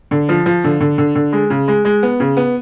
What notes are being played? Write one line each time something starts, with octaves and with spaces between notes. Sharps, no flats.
D3
F3
F3
D3
D3
D3
D3
G#3
C#3
G#3
G#3
B3
C#3
B3